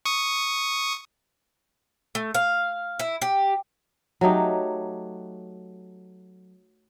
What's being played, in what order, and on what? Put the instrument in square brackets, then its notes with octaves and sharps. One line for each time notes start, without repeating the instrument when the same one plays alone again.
[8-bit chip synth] C#6 D#6
[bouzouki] A3
F5
E4
G4
[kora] F#3 A3 D#4 G4